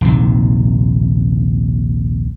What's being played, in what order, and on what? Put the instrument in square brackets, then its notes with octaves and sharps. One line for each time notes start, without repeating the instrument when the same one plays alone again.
[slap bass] A#1 D#2 C3 D#3